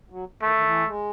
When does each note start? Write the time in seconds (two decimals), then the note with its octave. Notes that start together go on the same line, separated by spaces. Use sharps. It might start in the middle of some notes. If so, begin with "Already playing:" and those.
0.10 F#3
0.42 D#3 A3
0.55 D#3
0.64 E3
0.86 G#3